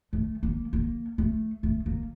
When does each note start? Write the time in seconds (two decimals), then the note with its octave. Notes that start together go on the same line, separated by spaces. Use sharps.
0.13 A3
0.43 A#3
0.73 A#3
1.18 A3
1.63 A3
1.86 A#3